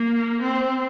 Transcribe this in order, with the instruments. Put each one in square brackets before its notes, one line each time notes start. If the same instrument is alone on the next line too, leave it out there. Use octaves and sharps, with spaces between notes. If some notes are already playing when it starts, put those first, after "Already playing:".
Already playing: [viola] A#3
C4